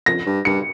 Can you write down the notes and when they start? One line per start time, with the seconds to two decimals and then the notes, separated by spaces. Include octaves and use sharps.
0.06 F2 A#6
0.26 G2
0.45 G2 C#7